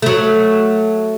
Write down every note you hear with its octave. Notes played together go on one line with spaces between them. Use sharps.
F#3 A3